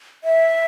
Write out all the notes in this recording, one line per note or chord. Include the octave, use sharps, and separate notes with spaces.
E5